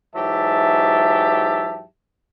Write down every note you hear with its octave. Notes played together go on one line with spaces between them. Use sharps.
G#2 E3 F#3 G4 E5 A5